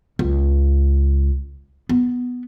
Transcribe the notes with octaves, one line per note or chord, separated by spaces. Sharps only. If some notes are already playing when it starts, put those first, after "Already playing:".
C#2
B3